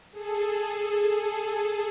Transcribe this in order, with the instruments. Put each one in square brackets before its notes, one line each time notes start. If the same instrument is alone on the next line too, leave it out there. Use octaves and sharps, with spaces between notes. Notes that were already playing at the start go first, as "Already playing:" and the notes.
[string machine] G#4 A4